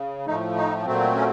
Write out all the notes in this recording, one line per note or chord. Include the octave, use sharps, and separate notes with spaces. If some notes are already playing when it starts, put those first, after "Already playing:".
Already playing: C#3
A2 F3 A3 D#4
D#4
A#2 F#3 A3 C4
C#4